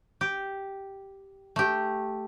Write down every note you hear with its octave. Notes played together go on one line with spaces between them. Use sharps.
G4
A3 G4